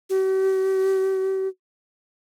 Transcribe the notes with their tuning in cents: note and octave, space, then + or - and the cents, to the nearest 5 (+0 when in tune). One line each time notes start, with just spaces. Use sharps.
G4 -45